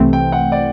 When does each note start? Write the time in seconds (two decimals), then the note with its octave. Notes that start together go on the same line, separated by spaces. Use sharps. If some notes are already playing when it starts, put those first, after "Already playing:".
Already playing: C2 C3 E3 A3 C4
0.13 G5
0.32 F#5
0.52 D5